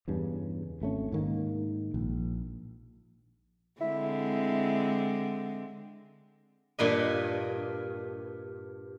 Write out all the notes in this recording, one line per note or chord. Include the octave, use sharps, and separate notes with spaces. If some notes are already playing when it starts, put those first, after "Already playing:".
E2 G2 C#3
G#1 A3 C#4
G#2 D#3 A#3
A#1
D3 G#3 C4 E4
G2 A#2 B4 D#5